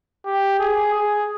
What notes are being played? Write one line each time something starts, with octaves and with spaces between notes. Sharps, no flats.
G4
G#4
G#4